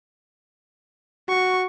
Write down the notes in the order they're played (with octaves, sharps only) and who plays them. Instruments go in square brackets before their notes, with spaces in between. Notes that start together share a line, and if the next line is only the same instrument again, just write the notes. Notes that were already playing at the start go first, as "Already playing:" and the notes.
[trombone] F#4 [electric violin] C#6